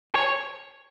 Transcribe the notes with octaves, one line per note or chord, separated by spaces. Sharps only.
C#5